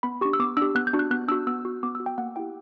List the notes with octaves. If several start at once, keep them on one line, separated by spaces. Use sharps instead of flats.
B3 B5
D4 G4 C#6
E6
B3 D6
D4 G4 E6
B3 F#6
G6
D4 F#4
F#6
B3 F#6
D4 F#4 E6
B3 E6
F#4
B3 D6
F#4 E6
G5
A#3 F#5
E4 G4 G5